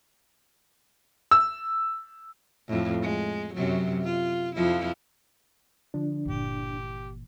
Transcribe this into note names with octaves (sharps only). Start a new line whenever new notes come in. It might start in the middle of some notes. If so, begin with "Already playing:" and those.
E6
F2 A2
G#3
F#2 C3 F#3
F4
F2 F3 E4
D3 F3 D4
G1 A#2 E3 G4